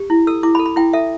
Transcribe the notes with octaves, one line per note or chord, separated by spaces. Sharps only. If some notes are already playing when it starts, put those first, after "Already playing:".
Already playing: G4
E4
A4 E6
E4 D6
B5
A4
B5
E4 G5
A4 E5